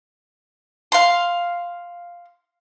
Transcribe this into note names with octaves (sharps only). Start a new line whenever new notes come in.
F5 C6